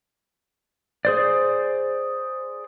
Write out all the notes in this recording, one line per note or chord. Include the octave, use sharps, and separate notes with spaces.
G#4 C5 D5